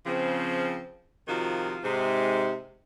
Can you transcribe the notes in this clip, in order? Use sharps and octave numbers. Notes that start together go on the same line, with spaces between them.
C#3 F3 C4
C3 D#3 F3 D#4 F4 F#4
G#2 C3 G#3